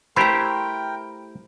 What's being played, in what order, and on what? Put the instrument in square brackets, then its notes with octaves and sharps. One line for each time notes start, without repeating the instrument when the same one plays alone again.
[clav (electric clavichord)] A3 E4 G4 [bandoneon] A#4 G5 [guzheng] C5 A#5 [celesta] B5